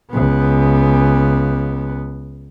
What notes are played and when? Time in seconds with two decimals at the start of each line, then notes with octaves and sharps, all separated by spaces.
0.12 C#2 B3